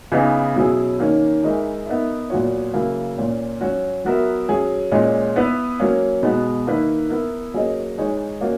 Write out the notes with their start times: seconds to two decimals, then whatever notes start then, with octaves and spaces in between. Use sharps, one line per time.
0.12 C#3 E3 B3 D#4
0.56 B2 F#3 C#4 E4 G#4
0.99 D#3 A#3 C#4
1.43 E3 G#3 D#4 A#4 E5
1.87 B3 D#4 A#4 E5
2.30 A#2 F#3 B3 F#4 C#5
2.74 C#3 F#3 A#3 E4
3.18 A#2 A#3 C#4
3.61 F#3 C#4 F#4
4.05 F#3 B3 F#4 A#4 E5
4.49 F#3 C#4 G#4
4.92 A#2 G#3 C#4
5.36 B3 E4 B4
5.80 F#3 A#3 C#4
6.23 B2 G#3 B3 F#4
6.67 D#3 A#3 E4 B4
7.10 B3 E4 A#4
7.54 F#3 A#3 C#4 G#4 D#5
7.97 E3 G#3 D#4 G#4 C#5
8.41 A#3 C#4 F#4